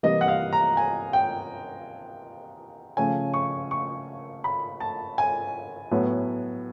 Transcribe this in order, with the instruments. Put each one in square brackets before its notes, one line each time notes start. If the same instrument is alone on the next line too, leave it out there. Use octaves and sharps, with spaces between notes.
[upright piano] C3 E3 G3 A#3 D#5
F#5
F5
A#5
G#5
G5
C#3 F3 A3 C#4 G#5
C#6
C#6
B5
A5
G#5
A2 F#3 B3